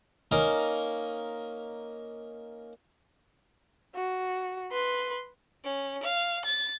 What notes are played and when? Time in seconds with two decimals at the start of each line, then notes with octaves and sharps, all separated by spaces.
0.31 A#3 C#4 D#4 A#4
3.95 F#4
4.72 B4 C6
5.64 C#4
6.03 F5
6.45 A6